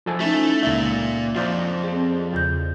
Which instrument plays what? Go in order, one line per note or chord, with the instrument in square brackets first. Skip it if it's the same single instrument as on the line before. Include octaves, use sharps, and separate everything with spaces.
[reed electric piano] F3 A4 G#5
[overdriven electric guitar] A3 [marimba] C#4 D#4 [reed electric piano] E4
[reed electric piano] C#2 E5 [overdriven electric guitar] A#2
[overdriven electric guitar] F2 [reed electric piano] F4 C5 D5
[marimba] C4 G#4
E2 C#3 G6